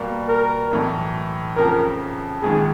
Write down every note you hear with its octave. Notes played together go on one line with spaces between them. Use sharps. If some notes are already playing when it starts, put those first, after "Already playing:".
Already playing: B2 G3 A#3
A#4
B1 A2 E3
F2 C#3 F3 A#4
A#1 G#2 D#3 G#4